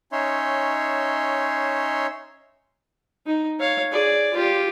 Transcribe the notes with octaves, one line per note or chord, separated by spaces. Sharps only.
C#4 D#4 C#5 E5 C6
D#4
C#5 F5
G#4 D5
F4 G4